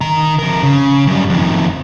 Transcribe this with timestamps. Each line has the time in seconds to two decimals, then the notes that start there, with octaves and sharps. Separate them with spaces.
0.01 D#3 A#5
0.39 F2 A#4
0.63 C#3
1.07 F#2 G3
1.30 F2 D#3